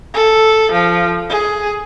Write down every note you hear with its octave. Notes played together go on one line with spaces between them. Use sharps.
A4
F3
G#4